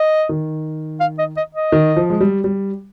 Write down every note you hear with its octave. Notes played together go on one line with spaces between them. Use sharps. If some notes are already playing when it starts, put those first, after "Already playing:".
Already playing: D#5
D#3
F5
D#5
D#5
D#5
D#3
F3
G#3
G3
G3